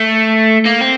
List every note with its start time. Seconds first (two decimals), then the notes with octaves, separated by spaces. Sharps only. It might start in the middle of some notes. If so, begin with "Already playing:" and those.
Already playing: A3
0.65 A#3
0.81 C4